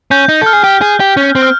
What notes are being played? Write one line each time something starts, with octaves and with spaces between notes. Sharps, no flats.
C#4 G6
D#4
A4 F6
G#4
G4
G#4
G4
C#4
C4
F6